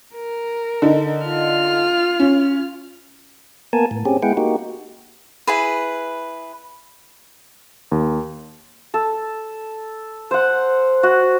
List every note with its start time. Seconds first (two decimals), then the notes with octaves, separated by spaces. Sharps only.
0.15 A#4
0.82 D3 D#4
1.25 F4 F6
2.20 C#4
3.73 A#3 B3 A#4 G#5 A5
3.91 A2
4.05 C4 C#4 G4 G#4
4.23 G#3 B3 E4 G#4 F#5 G5
4.37 A#3 D#4 F#4 G4
5.47 E4 G#4 B4
7.92 D#2
8.94 A4
10.31 C5 F#5
11.03 F#4